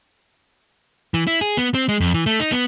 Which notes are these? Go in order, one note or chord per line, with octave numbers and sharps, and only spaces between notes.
E3
E4
G#4
B3
C4
G#3
F2
E3
A3
D#4
B3